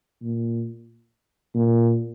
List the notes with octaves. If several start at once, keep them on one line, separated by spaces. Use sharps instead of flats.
A#2
A#2